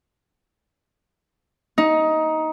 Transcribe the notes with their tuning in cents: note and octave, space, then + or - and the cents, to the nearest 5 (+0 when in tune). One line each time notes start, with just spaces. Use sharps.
D#4 +15